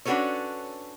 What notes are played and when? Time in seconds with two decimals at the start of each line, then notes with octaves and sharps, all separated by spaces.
0.05 C#4 D4 F#4 A4 B4 C#5